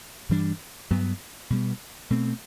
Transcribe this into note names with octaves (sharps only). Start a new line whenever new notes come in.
G2 E3 G3 D4
G2 F#3 B3
B2 G3 B3
B2 A3 C4